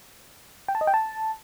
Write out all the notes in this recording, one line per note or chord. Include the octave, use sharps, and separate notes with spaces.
G5
A5
D#5
G5
A5